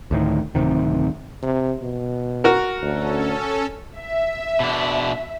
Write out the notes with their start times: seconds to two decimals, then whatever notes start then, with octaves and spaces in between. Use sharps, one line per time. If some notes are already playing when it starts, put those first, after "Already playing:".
0.11 D2 A2 D#3
0.55 D1 C2 C3 D#3
1.42 C3
1.82 B2
2.44 F#4 A#4
2.82 D2 C#4 A4
3.97 E5
4.60 B2 D4